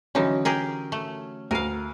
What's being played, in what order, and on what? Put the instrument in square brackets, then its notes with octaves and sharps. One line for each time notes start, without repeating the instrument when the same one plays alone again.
[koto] D3 E3 D#4 [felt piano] F#3 C#4
[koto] G4 G#4 A#4
A3
[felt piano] D2 D#7 [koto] A#4 F5